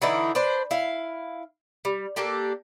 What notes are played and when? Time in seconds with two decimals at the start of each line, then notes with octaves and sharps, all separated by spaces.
0.02 D3 E3 D#4 E4
0.35 D4 B4 C5
0.71 E4 F5
1.85 G3
2.16 A#3 D4 G4 A4